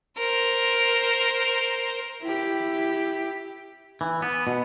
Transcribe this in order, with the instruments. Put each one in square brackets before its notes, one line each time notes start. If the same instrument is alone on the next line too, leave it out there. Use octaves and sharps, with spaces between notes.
[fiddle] A#4 C5
[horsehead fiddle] E4 G4
[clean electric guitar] E3
B3
B2